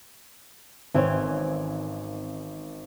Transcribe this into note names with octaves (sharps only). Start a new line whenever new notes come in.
G#1 E3 C4 C#4